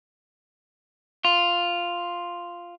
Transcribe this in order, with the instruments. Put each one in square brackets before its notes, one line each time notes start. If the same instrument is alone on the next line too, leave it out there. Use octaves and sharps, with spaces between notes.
[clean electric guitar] F4